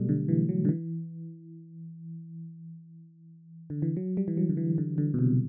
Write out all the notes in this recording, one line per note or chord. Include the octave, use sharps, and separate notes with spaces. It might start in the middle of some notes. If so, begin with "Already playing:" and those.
Already playing: B2 F#3 G3 A3
D3
E3
F#3
D3
E3
D3
E3
F#3
G3
E3
F#3
D3
E3
D3
D3
B2
C3